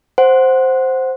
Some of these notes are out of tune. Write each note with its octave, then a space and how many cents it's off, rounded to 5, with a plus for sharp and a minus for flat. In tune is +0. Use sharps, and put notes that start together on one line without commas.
C5 +0 F#5 +0